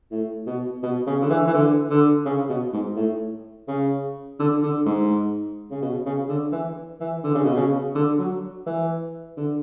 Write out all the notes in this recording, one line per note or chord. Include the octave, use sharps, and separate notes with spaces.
A2
B2
B2
C#3
D3
E3
E3
D3
D3
C#3
B2
G#2
A2
C#3
D3
D3
G#2
C#3
B2
C#3
D3
E3
E3
D3
C#3
B2
C#3
D3
F#3
E3
D3